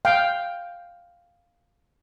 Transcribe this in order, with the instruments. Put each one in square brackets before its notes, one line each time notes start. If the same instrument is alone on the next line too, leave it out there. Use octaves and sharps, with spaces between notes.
[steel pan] F5 G5